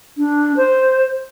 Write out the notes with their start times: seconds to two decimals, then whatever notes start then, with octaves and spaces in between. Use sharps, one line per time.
0.18 D4
0.57 C5